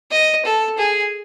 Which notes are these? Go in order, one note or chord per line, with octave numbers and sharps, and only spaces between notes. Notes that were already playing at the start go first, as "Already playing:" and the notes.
D#5
A4
G#4